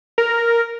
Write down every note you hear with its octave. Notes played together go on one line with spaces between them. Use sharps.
A#4